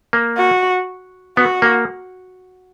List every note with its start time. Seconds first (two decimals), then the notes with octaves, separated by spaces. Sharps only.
0.13 A#3
0.38 F#4
1.37 B3 F#4
1.62 A#3